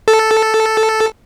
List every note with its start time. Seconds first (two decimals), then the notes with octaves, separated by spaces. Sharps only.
0.08 A4